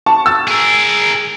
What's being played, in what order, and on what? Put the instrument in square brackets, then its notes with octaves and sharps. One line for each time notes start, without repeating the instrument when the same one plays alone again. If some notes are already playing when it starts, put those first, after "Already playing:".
[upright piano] A5 C#6
E6 A6
[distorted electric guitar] G#4 A#4